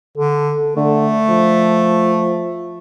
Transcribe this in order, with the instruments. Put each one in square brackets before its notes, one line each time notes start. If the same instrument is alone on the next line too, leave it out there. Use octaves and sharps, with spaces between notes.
[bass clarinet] D3 [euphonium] A4
[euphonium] D3 [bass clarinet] A3
[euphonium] F3